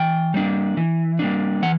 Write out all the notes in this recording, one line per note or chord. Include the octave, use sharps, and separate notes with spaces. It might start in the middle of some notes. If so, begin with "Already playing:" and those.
Already playing: E3 G5
G3 A#3 D4
E3
G3 A#3 D4
E3 F#5